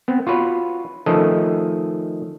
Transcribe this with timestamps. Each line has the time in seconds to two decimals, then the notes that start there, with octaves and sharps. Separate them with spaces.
0.08 B3 C4
0.27 F4 F#4 B4 C#5
1.06 D#3 F3 A3 C#4 A4 D#5